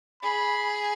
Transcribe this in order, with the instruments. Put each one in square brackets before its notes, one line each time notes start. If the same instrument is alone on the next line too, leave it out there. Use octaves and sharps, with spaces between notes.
[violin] G#4 [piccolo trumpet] B5